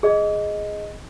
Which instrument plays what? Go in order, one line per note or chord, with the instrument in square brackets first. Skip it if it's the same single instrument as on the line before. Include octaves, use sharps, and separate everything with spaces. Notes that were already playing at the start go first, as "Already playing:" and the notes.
[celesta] G#4 D#5